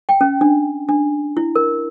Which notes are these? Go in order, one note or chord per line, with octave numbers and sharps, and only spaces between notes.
G5
C#4
D4
D4
E4
A#4